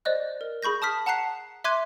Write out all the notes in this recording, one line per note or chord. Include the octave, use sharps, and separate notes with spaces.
C5 D5 D#5 F#6
A#4
G#4 B5 C#6 G6 A#6
A5 D#6 F6 B6
F#5 A5 A#5 F#6 C7
E5 C6 D6 F#6 G#6 D#7